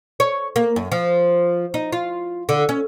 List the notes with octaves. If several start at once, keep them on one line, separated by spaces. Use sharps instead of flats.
C#5
A#3
F#2
F3
D#4
F4
D3
C#4